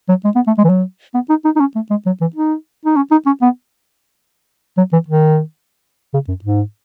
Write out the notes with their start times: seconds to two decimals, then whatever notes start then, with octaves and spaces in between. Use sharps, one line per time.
0.09 F#3
0.24 G#3
0.35 B3
0.47 A3
0.58 G#3
0.64 E3
0.69 F#3
1.14 B3
1.30 D#4
1.45 D#4
1.56 D#4
1.60 C#4
1.75 A3
1.90 G#3
2.06 F#3
2.21 E3
2.35 D#4
2.85 D#4
2.96 C#4
3.11 D#4
3.26 C#4
3.42 B3
4.77 F#3
4.93 E3
5.08 D#3
6.14 C#3
6.28 F#2
6.44 G#2